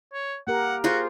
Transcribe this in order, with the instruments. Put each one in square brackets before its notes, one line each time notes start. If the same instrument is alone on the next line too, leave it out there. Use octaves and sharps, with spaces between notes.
[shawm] C#5
[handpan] A#3 G4 A#4 [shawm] F#5
[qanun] F4 G#4 C5 [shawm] F#4